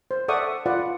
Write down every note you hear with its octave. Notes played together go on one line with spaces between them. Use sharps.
C5
A4 D5 E5 F#5 C#6 D#6
F4 B4 D5 F#5